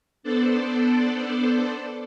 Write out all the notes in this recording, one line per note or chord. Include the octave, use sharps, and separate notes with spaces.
B3 D4 A4 C5 D5